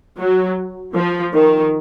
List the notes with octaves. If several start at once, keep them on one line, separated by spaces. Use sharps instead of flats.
F#3
F3
D#3